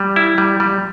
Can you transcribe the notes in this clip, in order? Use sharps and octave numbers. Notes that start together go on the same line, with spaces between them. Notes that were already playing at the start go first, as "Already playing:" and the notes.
Already playing: G3
E4
G3
G3